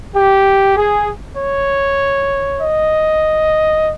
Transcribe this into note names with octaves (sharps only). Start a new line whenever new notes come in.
G4
G#4
C#5
D#5